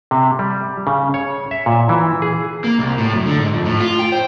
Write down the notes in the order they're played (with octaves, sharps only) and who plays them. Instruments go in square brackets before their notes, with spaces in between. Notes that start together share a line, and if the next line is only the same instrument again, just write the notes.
[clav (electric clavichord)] C3
G3
C#3
C#5
E5
A#2
E3
G#4
[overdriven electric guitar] A#3
C2
A2
F#2
D3
G#2
F2
A2
F4
G5
C5